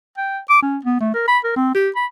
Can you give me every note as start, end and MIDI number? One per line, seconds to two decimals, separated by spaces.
0.17 0.38 79
0.50 0.62 86
0.62 0.78 61
0.85 0.97 59
1.01 1.09 57
1.14 1.25 70
1.28 1.39 83
1.44 1.52 70
1.56 1.74 60
1.75 1.89 67
1.96 2.05 83